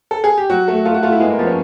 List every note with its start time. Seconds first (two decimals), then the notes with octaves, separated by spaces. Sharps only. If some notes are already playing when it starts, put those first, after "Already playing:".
0.11 A4
0.24 G#4
0.38 G4
0.50 F#3 F#4
0.68 A3
0.85 A3 F4
0.94 F#4
1.03 A3 F4
1.12 E4
1.20 G#3 B3
1.30 A#3
1.39 F3 B3
1.47 C#4